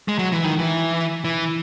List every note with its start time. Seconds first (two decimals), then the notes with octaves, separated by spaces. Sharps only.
0.08 G#3
0.19 F#3
0.32 E3
0.44 D#3
0.59 E3
1.24 E3